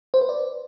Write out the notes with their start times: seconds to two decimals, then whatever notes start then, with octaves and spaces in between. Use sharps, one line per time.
0.14 C5
0.21 B4
0.29 D5